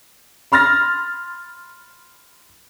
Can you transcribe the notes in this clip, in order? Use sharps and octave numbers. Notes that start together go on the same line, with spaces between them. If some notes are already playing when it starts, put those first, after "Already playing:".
B5 C6 F6 A6 A#6